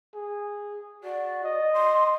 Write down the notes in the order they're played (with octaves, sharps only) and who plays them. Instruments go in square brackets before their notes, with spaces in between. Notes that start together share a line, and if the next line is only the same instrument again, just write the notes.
[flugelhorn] G#4
[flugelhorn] F#4 [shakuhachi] D5
[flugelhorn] D#5
[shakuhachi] C6